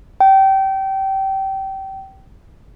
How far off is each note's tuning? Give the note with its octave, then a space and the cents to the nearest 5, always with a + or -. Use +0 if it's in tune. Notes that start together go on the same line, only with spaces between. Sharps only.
G5 -25